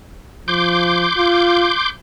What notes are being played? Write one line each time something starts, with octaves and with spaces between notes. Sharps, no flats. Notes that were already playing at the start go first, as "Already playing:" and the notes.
F3 C6 D6 G6
F4